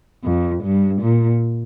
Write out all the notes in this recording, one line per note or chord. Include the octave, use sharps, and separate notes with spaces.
F2
G2
A#2